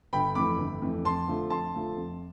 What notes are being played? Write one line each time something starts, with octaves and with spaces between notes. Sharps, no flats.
G1 G5 B5
F2 E3 A3 B5 D6
G1
F2 E3 A3
F2 A5 C6
D3 F3 A3
F2 A5 C6
D3 F3 A3
F2